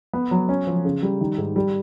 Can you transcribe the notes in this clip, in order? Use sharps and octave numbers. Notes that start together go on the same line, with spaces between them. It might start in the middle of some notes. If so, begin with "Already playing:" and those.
B3
F#3
C#4
F3
C#3
G3
D#3
G#2
G3